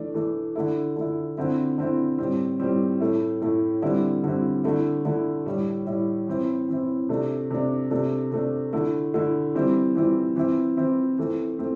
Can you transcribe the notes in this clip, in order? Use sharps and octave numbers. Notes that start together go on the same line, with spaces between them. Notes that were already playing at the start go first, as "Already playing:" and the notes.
Already playing: E3 A3 D4
E3 A3 D4
D3 A3 E4
D3 A3 E4
D3 C4 E4
D3 C4 E4
A2 G3 C4
A2 G3 C4
A2 A3 E4
A2 A3 E4
D3 G3 C4 E4
D3 G3 C4 E4
D3 A3 E4
D3 A3 E4
A2 G3 E4
A2 G3 E4
E3 C4 E4
E3 C4 E4
C3 A3 D4
C3 A3 D4
C3 A3 D4
C3 A3 D4
D3 A3 E4
D3 A3 E4
E3 G3 C4 E4
E3 G3 C4 E4
E3 C4 E4
E3 C4 E4
E3 A3 C4
A3 C4